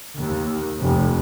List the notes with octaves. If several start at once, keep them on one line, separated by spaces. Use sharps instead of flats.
D#2
F1